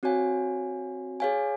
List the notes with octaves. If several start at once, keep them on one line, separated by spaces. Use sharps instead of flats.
C4 F#4 C#5 F5 G#5
G#4 C#5 F5 G#5